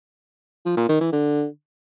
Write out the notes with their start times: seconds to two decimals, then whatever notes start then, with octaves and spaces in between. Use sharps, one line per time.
0.65 F3
0.77 A#2
0.89 D#3
1.01 E3
1.12 D3